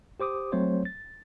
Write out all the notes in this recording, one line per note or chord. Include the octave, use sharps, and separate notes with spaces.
G4 C5 D6 D#6
F#3 A3 C4 C5 C#5
A6